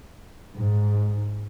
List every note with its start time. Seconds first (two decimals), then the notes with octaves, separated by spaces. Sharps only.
0.58 G#2